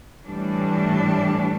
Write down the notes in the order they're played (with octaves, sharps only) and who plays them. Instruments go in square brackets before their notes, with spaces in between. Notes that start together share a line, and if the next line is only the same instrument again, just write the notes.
[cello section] A2 E3 G3 D4